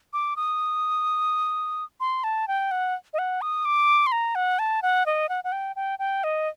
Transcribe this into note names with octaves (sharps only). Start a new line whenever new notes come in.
D6
D#6
C6
A5
G5
F#5
D#5
F#5
D#6
D6
C6
A#5
F#5
A5
F#5
D#5
F#5
F#5
G5
G5
G5
D#5